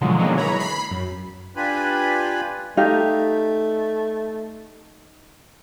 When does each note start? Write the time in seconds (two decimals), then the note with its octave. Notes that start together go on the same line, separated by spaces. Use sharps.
0.01 B2 D3 D#3 F3 F#3 G#3
0.17 D3 D#3 F#3 G#3 A#3 B3
0.36 E3 G#3 C#5 A#5 B5
0.60 B5 C7
0.91 F#2
1.56 D4 F4 G4 B4 G#5 B5
2.77 A3 D#4 G4 F5